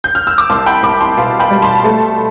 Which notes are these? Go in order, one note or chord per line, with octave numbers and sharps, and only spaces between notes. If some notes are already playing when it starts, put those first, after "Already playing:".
G6
F6
E6
D6
C2 A5 C6
G5 B5
C2 B5 D6
A5 C6
B2 F5 A5
G5 B5
G3
A5 C6
A3